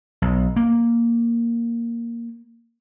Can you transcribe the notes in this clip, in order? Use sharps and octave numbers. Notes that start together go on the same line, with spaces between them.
B1
A#3